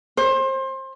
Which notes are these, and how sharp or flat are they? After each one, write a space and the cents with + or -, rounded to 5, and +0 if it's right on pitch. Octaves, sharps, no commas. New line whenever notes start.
C5 +25